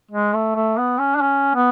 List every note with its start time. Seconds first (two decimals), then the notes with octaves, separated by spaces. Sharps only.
0.11 G#3
0.34 A3
0.56 A3
0.78 B3
0.99 C#4
1.16 D4
1.21 C#4
1.55 B3